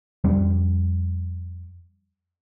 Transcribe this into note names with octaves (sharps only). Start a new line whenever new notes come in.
F2 G3 C4